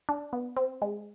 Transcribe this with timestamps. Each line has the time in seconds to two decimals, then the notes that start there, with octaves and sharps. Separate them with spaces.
0.09 D4
0.33 B3
0.57 C4
0.82 G#3